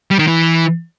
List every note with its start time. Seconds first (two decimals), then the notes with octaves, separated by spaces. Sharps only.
0.11 G3
0.19 D#3
0.27 E3